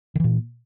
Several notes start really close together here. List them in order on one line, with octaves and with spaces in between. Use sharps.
D#3 E3 A#2